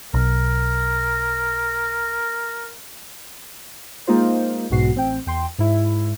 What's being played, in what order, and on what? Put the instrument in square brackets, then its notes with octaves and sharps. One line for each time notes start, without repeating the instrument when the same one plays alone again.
[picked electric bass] B1 [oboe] A#4
[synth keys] G#3 A#3 D#4 F4 C5
B1 G#2 B2 F#4 C7
A1 C4 G5
E2 G5 C6
G#2 E4